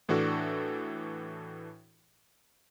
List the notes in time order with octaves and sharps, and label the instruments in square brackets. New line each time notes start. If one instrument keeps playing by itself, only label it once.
[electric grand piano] A2 E3 D4 F#4 A4